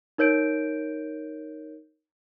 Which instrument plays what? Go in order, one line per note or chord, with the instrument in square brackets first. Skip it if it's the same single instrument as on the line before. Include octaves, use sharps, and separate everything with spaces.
[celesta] D#4 A#4 C#5 G6 D7